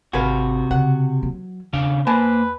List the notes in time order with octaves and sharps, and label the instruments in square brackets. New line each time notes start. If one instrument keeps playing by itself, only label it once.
[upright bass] G#1 C4 [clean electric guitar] C3 F#4 [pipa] G#4 B4 F5
[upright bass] C#3 [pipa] F#5
[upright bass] E3 F#3
[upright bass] E2 [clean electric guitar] C#3 D4 F5
[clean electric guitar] A#3 C5 [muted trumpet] B4 [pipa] G#5 A5